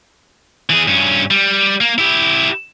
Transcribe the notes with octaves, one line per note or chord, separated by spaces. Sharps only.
E3 G#4
G2 C#4
G3
A#3
E4 G4